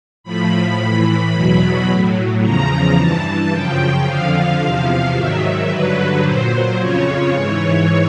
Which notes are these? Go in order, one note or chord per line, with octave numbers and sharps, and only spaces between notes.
A2 F3 B5
A2 E3
E2 B2 F#3
A2 F#3
E2 C#3 F3 A#5
G2 E3 A5
F#2 C#3 F3 G5
F2 D3 F3 F5
E2 C3 F3
G#2 D#3 F#3 E5
G2 D3 F#3 B4
A#2 F#3 C5
F2 C#3 F3 C#5
G#2 E3